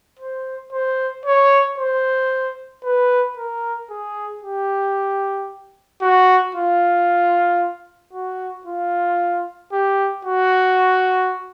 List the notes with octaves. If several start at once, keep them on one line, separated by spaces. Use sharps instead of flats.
C5
C5
C#5
C5
B4
A#4
G#4
G4
F#4
F4
F#4
F4
G4
F#4